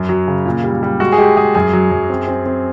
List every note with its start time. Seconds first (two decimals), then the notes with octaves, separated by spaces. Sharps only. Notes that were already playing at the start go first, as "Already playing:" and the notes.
Already playing: F#2
0.09 F#3
0.28 C#3
0.46 A#2
0.64 G3
0.83 G3
1.00 G#3 F#4
1.12 G#4
1.18 G#3 G4
1.37 G#3 G#4
1.55 F#2 G#4
1.73 F#3
1.91 F#2
2.10 C4
2.28 C4
2.46 C4